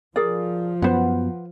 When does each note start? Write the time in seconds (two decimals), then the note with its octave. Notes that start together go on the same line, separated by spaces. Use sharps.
0.16 F3 G#4 A#4 D5
0.82 F#2 B3 B4 C5 F#5